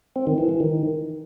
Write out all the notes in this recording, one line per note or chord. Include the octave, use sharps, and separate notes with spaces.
C4
D#3
E3
E3
D#3